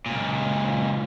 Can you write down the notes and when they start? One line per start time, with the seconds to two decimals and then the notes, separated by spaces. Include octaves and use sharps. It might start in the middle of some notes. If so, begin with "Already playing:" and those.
0.06 C#2 A#2